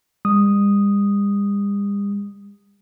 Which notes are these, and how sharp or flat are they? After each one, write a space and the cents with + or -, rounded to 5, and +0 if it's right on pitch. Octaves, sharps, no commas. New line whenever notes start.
G3 +45 D#6 +0